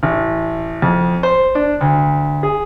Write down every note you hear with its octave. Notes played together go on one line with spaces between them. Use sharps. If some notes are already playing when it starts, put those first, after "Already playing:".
A1
F2
C5
D4
D2
G#4